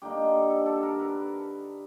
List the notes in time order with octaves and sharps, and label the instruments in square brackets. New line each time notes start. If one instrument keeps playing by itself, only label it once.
[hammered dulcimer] D3 G3 A#3 D#4 G4
A4
A4
A4
A#4
B4